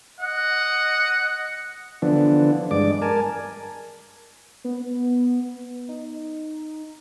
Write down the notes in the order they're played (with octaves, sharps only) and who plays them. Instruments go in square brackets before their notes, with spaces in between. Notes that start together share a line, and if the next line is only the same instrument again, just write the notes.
[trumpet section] D#5 F#5
[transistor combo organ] D3 E3 F3 B3 D4
G2 G#3 D5 D6
A#4 G#5 A5
[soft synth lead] B3
D#4